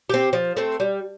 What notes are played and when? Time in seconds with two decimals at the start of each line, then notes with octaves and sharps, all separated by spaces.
0.09 C4 G4
0.33 F3
0.57 A3 C4
0.80 G3